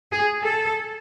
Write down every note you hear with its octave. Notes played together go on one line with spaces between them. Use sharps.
G#4
A4